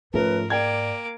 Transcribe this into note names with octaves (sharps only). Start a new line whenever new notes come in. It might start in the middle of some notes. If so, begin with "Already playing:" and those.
G#2 F3 A3 C#4 A#4 B4
A#3 D5 G5 D6 G#6